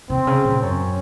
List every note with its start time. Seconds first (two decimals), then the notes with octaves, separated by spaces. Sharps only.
0.10 C3 C4
0.27 C#3
0.44 A#2
0.62 F#2 C#4